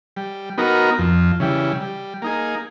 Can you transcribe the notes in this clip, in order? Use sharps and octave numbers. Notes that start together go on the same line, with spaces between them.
G3
B3 D#4 F#4 A#4
F2
C#3 E3 G3
G3
A#3 D#4 G#4